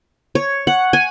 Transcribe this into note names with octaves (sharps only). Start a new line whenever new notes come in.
C#5
F#5
G#5